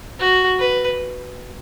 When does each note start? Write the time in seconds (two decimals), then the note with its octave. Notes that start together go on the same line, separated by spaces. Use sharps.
0.20 F#4
0.59 B4